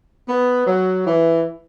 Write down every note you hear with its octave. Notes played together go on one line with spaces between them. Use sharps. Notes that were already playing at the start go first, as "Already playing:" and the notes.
B3
F#3
E3